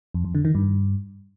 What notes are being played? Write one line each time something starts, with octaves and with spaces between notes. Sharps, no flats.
F2
F2
D3
D#3
G2